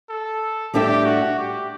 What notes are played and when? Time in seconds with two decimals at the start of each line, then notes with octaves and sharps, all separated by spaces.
0.09 A4
0.74 A2 G3 D4 G4 A4 E5
1.05 F#4
1.39 G4